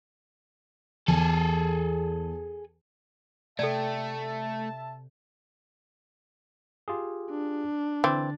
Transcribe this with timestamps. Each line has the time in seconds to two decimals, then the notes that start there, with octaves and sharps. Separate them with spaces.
1.08 E2 G#4 A4
3.59 C3 A3 A4 D5 E5 G5 A5
6.88 F4 G4 G#4
7.30 D4
8.04 D3 E3 C4 A6